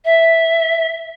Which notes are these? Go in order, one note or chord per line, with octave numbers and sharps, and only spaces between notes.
E5